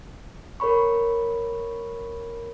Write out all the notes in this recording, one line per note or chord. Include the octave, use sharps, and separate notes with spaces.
A#4 C#5 B5 C#6